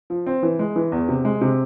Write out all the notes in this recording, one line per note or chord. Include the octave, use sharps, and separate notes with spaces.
F3
C4
E3
G#3
E3
E2
C3
G#3
C3